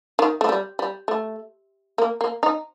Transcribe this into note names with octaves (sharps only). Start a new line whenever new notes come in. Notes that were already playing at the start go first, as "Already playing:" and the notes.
D#3
A3
G3
G3
A3
A#3
A#3
D#4